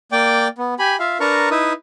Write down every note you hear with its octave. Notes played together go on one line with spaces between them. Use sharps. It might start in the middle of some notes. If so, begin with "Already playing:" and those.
A#3 D5 G5 D6
B3
G4 G#5 B5
F4 E5 F5
D4 A#4 B4 A5 A#5 C#6
D#4 E4 B4 E5 D#6